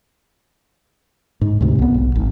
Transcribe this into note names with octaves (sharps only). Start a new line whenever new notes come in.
G#2
D2 G#2 C3
C2 B3
B1
G#1